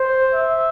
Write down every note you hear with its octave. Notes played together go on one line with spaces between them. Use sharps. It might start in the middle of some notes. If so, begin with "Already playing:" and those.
Already playing: C5
E5